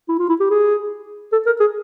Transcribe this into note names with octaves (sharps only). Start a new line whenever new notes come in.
E4
F4
E4
G4
G#4
A4
A#4
G#4